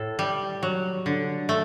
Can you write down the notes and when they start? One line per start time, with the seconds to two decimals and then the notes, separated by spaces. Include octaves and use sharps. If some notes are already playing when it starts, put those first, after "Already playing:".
Already playing: A2 A4
0.19 G3
0.63 F#3
1.06 D3
1.49 A3